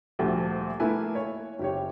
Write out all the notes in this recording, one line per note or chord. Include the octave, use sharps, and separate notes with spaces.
D2 A#2 F3 G3 A3
A3 A#3 E4 B4 G#5
C#5
F#1 G4 C#5